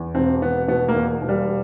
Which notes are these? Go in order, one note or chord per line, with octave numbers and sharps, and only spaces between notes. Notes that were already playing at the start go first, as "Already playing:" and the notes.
Already playing: E2
E1 C4
E1 B3
B2 B3
A#3
E2
E1
G3